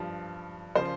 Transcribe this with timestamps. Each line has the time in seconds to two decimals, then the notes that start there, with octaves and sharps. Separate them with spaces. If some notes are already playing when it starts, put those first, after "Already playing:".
Already playing: G2 F3
0.75 C#3 F3 C5